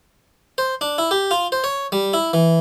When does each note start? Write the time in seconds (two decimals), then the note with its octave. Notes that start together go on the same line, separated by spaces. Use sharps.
0.58 C5
0.81 D4
0.98 E4
1.11 G4
1.31 F4
1.52 C5
1.64 C#5
1.92 G3
2.13 E4
2.33 E3